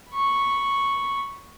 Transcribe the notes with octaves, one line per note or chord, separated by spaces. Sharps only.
B5 C#6